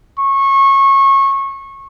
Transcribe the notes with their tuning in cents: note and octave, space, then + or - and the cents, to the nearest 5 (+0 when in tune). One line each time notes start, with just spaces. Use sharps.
C#6 -25